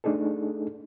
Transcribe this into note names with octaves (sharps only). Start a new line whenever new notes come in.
A3 D4 D#4 G#4 A4